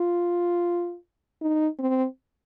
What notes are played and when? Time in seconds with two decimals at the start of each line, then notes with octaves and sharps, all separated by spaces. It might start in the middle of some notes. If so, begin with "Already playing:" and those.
Already playing: F4
1.42 D#4
1.79 C4